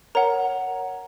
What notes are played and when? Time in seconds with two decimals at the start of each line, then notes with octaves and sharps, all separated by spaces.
0.15 A#4 C#5 F#5 A#5